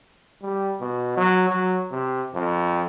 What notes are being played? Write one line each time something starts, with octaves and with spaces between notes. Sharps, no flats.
G3
B2
F#3
F#3
C3
F2